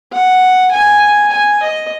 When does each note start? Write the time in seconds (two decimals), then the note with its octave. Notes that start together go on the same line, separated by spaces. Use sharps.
0.12 F#5
0.72 G#5
1.32 G#5
1.62 D#5